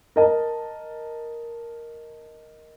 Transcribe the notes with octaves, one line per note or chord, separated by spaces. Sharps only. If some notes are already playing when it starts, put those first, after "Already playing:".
A#4 D#5 A5